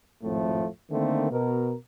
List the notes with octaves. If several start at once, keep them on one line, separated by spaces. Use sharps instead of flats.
G#1 F2 A2 F3 A3
D3 D#3 A3 A#3 C4
B2 A#4